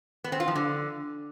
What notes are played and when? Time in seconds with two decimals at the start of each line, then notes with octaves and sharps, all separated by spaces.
0.24 B3
0.32 C4
0.40 F4
0.48 F3
0.55 D3